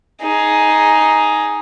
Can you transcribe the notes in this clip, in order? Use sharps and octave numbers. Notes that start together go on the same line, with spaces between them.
D#4 G#4